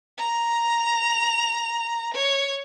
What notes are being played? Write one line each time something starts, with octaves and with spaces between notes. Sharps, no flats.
A#5 F7
C#5